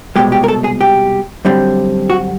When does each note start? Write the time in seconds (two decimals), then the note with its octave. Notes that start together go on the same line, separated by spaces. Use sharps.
0.16 C2 B2 G#3 G4
0.32 G4
0.44 A#4
0.48 A4
0.64 G#4
0.81 G4
1.45 F#2 D3 G3 C4
2.10 F#4